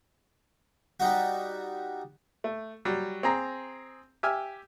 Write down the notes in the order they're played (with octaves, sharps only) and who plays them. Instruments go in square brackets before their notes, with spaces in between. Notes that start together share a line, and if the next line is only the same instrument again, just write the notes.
[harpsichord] G3 D#4 F#4
[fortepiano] A3
F#3 G3
C4 G#4 A#5
G4 E5 G#5 F6